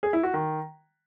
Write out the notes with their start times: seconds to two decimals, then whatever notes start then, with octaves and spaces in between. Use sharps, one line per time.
0.03 G#4
0.13 E4
0.23 F#4
0.34 D#3